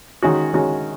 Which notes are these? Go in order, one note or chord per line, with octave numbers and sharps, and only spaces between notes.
D#3 G#3 C#4 F#4
D#3 G#3 C#4 F#4